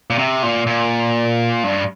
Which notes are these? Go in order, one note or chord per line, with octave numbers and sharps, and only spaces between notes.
A#2
C3
A#2
A#2
G2